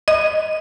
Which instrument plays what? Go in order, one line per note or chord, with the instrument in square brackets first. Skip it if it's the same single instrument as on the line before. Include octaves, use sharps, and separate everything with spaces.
[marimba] D#5